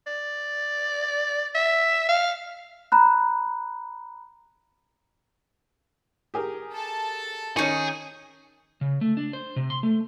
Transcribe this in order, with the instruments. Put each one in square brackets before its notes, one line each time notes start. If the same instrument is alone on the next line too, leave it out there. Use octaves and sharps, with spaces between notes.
[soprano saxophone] D5
E5
F5
[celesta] A#5 B5 F#6
[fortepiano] G4 G#4 A#4
[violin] A4 A5
[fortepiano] D#3 C#4 [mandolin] D#4 C#6 [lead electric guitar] G#4
[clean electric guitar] C#3
A3
D4
C5
C3
C6
A3